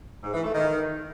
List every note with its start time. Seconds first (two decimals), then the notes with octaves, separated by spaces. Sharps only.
0.23 G#2
0.33 E3
0.43 A3
0.53 D#3